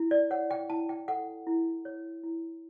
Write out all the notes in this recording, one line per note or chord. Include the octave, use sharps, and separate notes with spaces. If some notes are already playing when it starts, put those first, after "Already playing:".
Already playing: E4
D5
C#5 F#5
G5
E4 A5
G5
A4 F#5
E4
C#5
E4